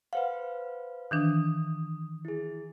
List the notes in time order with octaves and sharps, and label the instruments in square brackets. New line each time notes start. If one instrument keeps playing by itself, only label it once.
[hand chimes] B4 C5 F5 [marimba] F#5
[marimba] D#3 E3 D4 [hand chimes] D#6
[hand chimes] E4 G#4